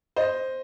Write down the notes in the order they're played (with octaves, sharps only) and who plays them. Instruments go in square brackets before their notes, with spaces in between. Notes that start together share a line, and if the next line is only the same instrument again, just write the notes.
[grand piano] C5 D#5